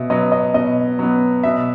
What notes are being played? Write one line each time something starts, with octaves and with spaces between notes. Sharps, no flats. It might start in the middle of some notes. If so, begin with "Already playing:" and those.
Already playing: B2 E5
F#3 B3 D#5
D#5
B2 D#5
F#3 B3
B2 E5